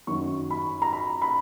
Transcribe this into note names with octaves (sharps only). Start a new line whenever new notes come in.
F#2 D#3 F#3 C#6
B5
A#5
B5
B5